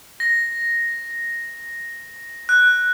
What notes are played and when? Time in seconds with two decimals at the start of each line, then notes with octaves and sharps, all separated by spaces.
0.20 A#6
2.49 F#6